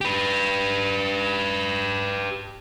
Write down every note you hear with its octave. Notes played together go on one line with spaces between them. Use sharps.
G4 B4